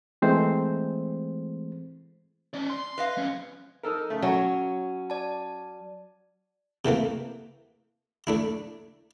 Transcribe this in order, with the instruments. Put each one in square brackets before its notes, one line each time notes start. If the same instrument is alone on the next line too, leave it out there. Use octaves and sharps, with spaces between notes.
[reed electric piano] E3 G#3 A3 C4 C5
[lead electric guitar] C#4 D5
C6
[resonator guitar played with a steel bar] B4 D#5 F5
[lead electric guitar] F3 C#4
[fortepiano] D#4 A4 A#4
C#3 A3
[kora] F#3 [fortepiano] C#4
[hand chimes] D5 A5
[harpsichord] C3 E3 A3 A#3
A3 D4 E4